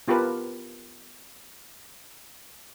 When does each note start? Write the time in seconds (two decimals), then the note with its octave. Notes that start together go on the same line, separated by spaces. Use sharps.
0.08 B3 F4 G4 A#4 B4 A5